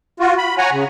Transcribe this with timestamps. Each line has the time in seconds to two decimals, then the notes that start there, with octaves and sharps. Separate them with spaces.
0.20 F4 F#4
0.38 B5
0.58 C#5 F#5 G#5 A#5
0.72 C#3